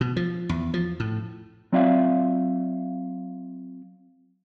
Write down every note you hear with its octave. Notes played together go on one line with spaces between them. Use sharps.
B2
F3
E2
F3
A2
F#3 C4 F4 D5 E5 F5